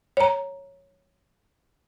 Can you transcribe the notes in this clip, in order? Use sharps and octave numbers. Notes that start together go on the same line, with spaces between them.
C#5 A#5